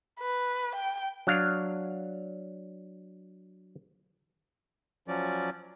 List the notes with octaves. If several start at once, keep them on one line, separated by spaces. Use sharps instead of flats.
B4
G5
F#3 D4 F5
F3 F#3 C#4 D5